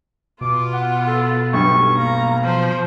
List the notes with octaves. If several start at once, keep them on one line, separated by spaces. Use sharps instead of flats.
B2 B3 F4 D6
F#5
A4
B1 G2 C#6
A#3 A#5
F3 C5